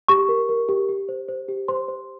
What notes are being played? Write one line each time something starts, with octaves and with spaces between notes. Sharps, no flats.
G4 C#6
A#4
A#4
G4
G4
C5
C5
G4
C5 C6
C5